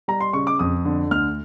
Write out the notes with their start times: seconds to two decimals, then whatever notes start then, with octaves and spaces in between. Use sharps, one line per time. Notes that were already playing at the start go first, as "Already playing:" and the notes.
0.08 G3 A#5
0.20 C6
0.33 C#3 C#6
0.47 D6
0.59 F2 D#6
0.85 D3
1.11 D2 F6